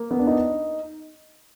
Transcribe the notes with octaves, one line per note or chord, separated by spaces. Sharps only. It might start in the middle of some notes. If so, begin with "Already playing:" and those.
Already playing: A#3
B3
D4
D#4